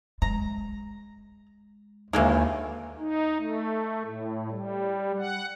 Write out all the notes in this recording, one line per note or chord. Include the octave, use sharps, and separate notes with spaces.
G#3 A#5
G#1 D#2 D3 E3 G#3 A#3
D#4
A3
A2
G3
F#5